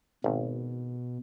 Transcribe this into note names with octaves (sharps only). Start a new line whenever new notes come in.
G#1 B2